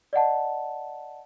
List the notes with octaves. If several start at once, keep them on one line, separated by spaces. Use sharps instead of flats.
D5 D#5 F#5 A5